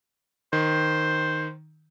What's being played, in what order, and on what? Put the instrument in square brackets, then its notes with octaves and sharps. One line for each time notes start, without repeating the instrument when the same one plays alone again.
[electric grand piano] D#3 [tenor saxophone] C5